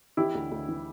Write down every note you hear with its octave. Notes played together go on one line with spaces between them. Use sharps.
E3 E4 G4
D2
D2
E3